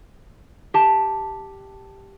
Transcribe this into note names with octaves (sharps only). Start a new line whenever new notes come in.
G4 A5